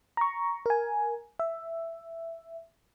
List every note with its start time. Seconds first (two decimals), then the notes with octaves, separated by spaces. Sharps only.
0.17 A#5 C#6
0.66 A#4 G#5
1.40 E5